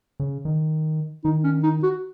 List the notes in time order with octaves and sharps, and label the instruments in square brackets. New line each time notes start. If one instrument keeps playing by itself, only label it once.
[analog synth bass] C#3
D#3
[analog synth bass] D#3 [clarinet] D#4
[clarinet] C#4
D#4
F#4